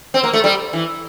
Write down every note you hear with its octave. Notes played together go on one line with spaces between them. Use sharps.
C4
A#3
A3
G3
E3